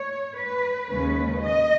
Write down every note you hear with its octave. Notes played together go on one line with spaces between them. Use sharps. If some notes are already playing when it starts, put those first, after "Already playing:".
Already playing: C#5
B4
D#2 C#3 G#3 C#4 B4
D#5